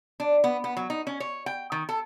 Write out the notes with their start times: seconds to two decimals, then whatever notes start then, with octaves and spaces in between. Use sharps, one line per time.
0.20 D4
0.44 B3
0.64 B3
0.77 F#3
0.90 D#4
1.07 C#4
1.20 C#5
1.46 G5
1.72 D#3
1.89 A4